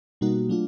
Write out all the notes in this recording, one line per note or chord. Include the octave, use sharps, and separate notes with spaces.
B2 G3 A#3 D#4 F#4
F#3 A3 D4 F4